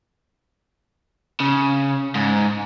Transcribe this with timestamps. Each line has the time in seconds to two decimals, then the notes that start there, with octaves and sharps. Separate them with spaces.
1.40 C#3
2.15 G#2